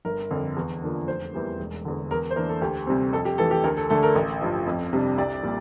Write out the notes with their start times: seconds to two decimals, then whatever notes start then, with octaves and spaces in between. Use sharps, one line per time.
0.05 G1 A#4
0.31 F2 D3
0.57 E2
0.83 D3 F3 A#3 D4
1.08 F1 C5
1.33 E2 E3 G3 A#3
1.59 E1
1.85 E2 D3
2.11 E2 A#4
2.31 C5
2.36 E3 A#3 D4 A#4
2.49 A4
2.62 D2 G4
2.87 C3 G3 C4
3.12 F2 A4
3.25 G4
3.38 E3 A3 A4
3.51 G4
3.64 D2 A#4
3.77 A4
3.90 D3 A3 D4 A4
4.03 A#4
4.15 A1
4.41 G2 F3
4.67 F2
4.93 C3 G3 D4
5.18 C2 D5
5.43 A#2 G3